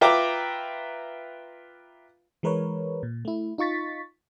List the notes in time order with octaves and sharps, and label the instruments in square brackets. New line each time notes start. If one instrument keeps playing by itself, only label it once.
[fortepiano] F4 B4 E5 G5 A#5 D6
[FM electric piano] E3 G#3 A#4 B4 C#5
A#2
A3 E4
D#4 F4 C#6 A6 B6